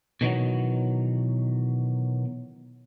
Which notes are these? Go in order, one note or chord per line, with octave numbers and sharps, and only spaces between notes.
B2 D#3 E3 F#3